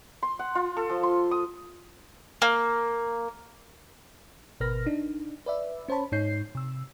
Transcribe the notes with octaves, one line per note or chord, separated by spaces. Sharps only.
C6
F#5
F4
A4
F3
C6
D#6
A#3
G#1 B2 A#4 B4 F6 A#6
D4 D#4
B4 D5 E5
C#4 C5 C#5 A5 B5
G#2 D#4 C#5 G6 C7
C3 E6